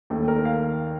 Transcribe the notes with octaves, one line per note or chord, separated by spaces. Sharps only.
D#2 D#3 A3
A#4
F5